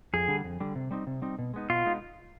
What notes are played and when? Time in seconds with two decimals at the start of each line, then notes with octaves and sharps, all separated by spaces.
0.13 F2 G#4
0.28 D3 G3
0.44 F2
0.60 D3 G3
0.75 C3
0.91 G3 C4 D#4
1.07 C3
1.22 G3 C4 D#4
1.39 B2
1.54 G#3 B3 D#4
1.70 B2 F4
1.85 G#3 B3 D#4